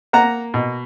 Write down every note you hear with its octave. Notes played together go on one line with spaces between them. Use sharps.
A#3 F#5 A#5
B2